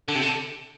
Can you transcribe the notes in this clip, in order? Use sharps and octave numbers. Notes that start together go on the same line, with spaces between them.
D3
C3
D3